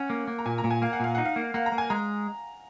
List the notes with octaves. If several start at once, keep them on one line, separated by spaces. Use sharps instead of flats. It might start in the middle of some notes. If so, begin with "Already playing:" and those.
Already playing: C#4 F#5
A#3
A#3
A#5
A#2 G#5
A#5
A#2
G#5
A#3 F5
F#5
A#2 F5
D#4 F#5
F5
A#3
A#3 F#5
A#5
A#3
G#5
G#3 A#5